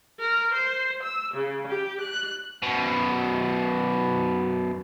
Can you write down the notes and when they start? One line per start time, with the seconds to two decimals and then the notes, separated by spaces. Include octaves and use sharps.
0.21 A#4
0.54 C5
1.03 E6
1.35 C#3
1.68 G4
2.01 F#6
2.62 F#2 B2